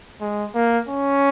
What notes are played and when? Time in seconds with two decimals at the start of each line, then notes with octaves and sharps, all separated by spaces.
0.21 G#3
0.55 A#3
0.89 C#4